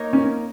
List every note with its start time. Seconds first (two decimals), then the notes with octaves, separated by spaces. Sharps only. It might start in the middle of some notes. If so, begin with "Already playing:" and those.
Already playing: A#3 D#4 A#4 C#5
0.13 C#4